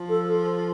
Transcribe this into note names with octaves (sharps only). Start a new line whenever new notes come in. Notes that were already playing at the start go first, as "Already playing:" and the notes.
Already playing: F3
A4